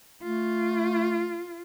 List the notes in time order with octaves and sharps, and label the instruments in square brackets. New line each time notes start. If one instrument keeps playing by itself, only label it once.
[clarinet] A3 [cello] F4